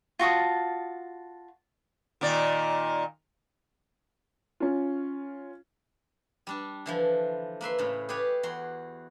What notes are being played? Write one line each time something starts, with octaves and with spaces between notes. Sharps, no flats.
F4 F#4 A5 D#6
A#2 D#3 D5
C#4 F4
G3 D4 A5
D3 E3 F3
A#3 B4 E5 C6
A2 C#3
G4 G#4 B4 C#5 D5
E2 F#4 C6